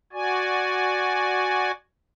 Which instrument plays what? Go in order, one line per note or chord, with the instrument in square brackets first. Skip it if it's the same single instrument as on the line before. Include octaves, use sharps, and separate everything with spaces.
[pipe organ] F#4 D5 G#5